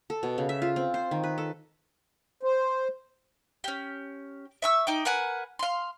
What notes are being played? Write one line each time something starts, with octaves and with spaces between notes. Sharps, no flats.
A4
B2
C#3
E5
F4
C4
C5
D#3
B4
A4
C5
C#4 G4
E5 C#6 E6
D#4 G5 D6
A#4 B4 F#5 G#5
F5 C6